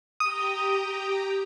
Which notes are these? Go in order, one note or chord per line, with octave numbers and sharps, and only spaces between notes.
G4 G5 A#5 D#6